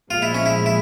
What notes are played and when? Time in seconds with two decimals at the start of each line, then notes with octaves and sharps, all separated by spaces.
0.10 A#2 F3 G#3 F4
0.22 E4
0.34 C#4
0.46 E4
0.66 E4